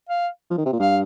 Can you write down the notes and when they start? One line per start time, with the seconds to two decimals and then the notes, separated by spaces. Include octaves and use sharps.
0.09 F5
0.51 F3
0.58 D#3
0.66 C3
0.72 A#2
0.79 G2 F5